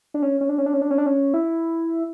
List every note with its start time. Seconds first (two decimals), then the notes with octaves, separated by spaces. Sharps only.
0.14 D4
0.22 C#4
0.41 C#4
0.49 D4
0.58 C#4
0.66 D4
0.73 C#4
0.82 D4
0.90 C#4
0.98 D4
1.06 C#4
1.34 E4